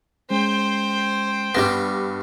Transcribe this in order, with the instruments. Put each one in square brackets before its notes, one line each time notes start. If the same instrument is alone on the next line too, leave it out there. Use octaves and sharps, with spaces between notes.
[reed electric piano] G#3 C#4 [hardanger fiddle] C5 G5
[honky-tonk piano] G2 A#6 [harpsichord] G3 B3